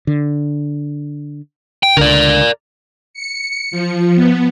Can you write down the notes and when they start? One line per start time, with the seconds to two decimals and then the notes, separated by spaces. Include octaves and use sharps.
0.07 D3
1.83 G5
1.97 C#2 D3 A#4 D5
3.14 C#7
3.71 F3
4.16 B3